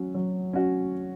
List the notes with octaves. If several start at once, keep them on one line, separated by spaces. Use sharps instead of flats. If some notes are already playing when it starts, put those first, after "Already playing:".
Already playing: F#3 C#4 F#4
F#3
C#4 F#4